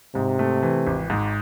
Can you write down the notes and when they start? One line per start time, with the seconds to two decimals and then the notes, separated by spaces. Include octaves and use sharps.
0.15 G#2 C3
0.39 A3
0.63 E3
0.87 G#1
1.10 G#2